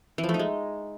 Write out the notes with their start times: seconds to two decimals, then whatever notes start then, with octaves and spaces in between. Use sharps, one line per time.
0.18 E3
0.23 F3
0.29 A3
0.34 D#4
0.39 G#3